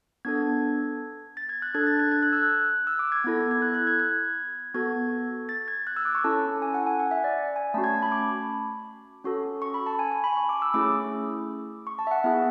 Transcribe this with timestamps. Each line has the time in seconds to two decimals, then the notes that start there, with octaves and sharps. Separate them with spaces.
0.25 B3 D4 A4 G#6
1.37 A6
1.49 G#6
1.62 F#6
1.74 D4 A4 G#6
1.87 A6
1.94 F#6
2.00 G#6
2.12 G#6
2.22 F#6
2.33 E6
2.43 F#6
2.87 E6
2.99 D6
3.12 G#6
3.25 B3 E4 A4
3.51 G#6
3.62 F#6
3.74 F#6
3.87 G#6
3.99 G#6
4.74 B3 F#4 A4 G#6
5.49 A6
5.68 G#6
5.87 F#6
5.96 E6
6.05 D6
6.15 C#6
6.24 C#4 E4 A4 A5
6.62 G#5
6.74 F#5
6.86 G#5
6.99 F#5
7.11 E5
7.24 D5
7.56 G#5
7.74 A3 C#4 F#4 A5
7.84 G#6
7.93 A5
8.02 B5
8.12 D6
9.24 C#4 F#4 A4
9.62 C#6
9.74 B5
9.86 A5
9.99 G#5
10.12 G#5
10.24 B5
10.37 C#6
10.49 D6
10.62 E6
10.74 A3 C#4 E4 G#4 D6
11.87 C#6
11.99 A5
12.07 E5
12.11 F#5
12.24 B3 E4 G#4 E5